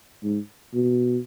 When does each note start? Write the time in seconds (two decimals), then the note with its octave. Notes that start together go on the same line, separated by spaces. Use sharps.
0.23 G#2
0.73 B2